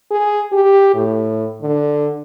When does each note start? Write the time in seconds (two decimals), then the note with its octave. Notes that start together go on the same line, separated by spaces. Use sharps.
0.11 G#4
0.53 G4
0.95 A2
1.62 D3